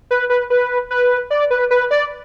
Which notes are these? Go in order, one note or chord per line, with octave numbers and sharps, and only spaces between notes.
B4
B4
B4
B4
D5
B4
B4
D5